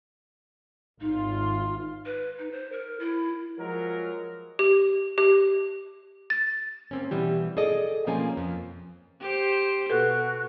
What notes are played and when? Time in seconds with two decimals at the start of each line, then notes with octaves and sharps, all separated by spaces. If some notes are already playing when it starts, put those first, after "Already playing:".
1.01 G#1 D#4 F4
2.06 B4
2.39 D#4
2.52 C5
2.72 A#4
3.00 E4
3.59 F3 F#3 G#3 A#4
4.59 G4
5.18 G4
6.30 A6
6.91 A#3 C4 C#4
7.11 B2 E3 G3 G4
7.57 G#4 A4 D5 D#5
8.06 B2 F3 A#3 C4 C#4 G#5
8.37 F2
9.21 G4 C5
9.90 B2 F#4 A4 B4